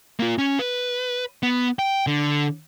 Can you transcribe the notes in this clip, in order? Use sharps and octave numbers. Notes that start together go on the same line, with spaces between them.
A#3 F4
C#4
B4
B3
G5
D3